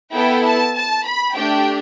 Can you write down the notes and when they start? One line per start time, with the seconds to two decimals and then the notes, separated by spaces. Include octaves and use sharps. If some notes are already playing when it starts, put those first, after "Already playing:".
0.13 B3 E4 A4 G5
0.44 A5
0.75 A5
1.06 B5
1.36 A3 D4 G4 G5